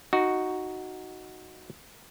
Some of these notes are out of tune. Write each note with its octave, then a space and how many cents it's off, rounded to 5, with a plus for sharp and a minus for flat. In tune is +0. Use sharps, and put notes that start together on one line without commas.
D#4 +0 F#4 +0